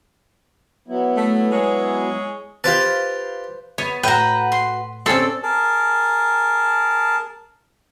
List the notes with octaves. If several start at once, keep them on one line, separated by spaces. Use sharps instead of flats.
F#3 B3 E4
A3
G#3 G#4 C#5
F4 G4 B4 C5 F5 A5
B3 C#5
A2 F#4 B4 G5 A#5
C6
C4 C#4 A4 C5 D5 E6
G#4 A#4 A5